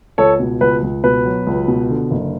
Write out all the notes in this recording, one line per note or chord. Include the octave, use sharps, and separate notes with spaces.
C#2 A4 C#5
B2
C#2 B4
C#2
B2 B4
F#3
C#2
B2
D3
F#1